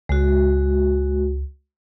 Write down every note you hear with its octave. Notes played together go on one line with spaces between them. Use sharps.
C#2 G#3 F#4